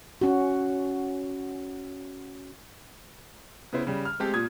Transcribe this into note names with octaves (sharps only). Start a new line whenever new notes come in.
C#4 F#4
C#3 B3 E4 C5
C#3 G3
F6
G#3 A3 C4 G4 A4
A#2 D#6 G#6